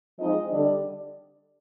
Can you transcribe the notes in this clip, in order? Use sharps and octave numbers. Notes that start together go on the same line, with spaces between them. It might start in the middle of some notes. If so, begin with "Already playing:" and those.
F3 G#3 C4 D#4 D#5
D3 G3 D4 D5